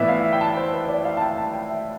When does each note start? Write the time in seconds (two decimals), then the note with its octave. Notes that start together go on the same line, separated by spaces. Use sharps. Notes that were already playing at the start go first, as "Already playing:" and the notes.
Already playing: A2 E3 B3 E4 D5 E5
0.08 F5
0.24 E5
0.33 G5
0.41 A5
0.57 C5
0.73 B4
0.88 D5
1.05 F5
1.17 A5
1.21 G5
1.38 A5
1.53 G5
1.69 E5